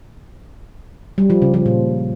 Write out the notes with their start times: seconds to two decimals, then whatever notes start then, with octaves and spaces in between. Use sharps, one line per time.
1.18 G3
1.30 F3
1.42 C#3
1.54 F3
1.66 A#2